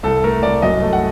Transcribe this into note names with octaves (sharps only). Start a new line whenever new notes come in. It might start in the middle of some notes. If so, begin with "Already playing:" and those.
C2 A4
A3 A#4
C2 D5
F#2 D#5
A3
F#5